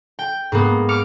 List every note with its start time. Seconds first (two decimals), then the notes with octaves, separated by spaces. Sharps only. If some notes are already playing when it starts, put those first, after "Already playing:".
0.19 G5
0.52 G#2 A#3 B3
0.89 D6 F6 C#7